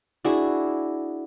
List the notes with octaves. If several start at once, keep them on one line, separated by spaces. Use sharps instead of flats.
D4 E4 F#4 G#4